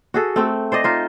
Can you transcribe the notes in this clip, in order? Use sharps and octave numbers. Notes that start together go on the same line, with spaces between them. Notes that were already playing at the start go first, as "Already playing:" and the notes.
F#4 G#4 A4
A3 C4 G5
C5 D5 D#5
D#4 F4 C5